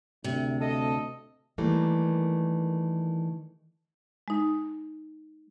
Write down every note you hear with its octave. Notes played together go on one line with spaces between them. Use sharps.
D2 C3
A4 D#5
D#3 E3 G3 A3 A#3
G#3 D#4